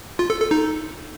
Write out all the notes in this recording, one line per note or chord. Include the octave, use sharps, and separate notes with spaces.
F4
A4
A4
D#4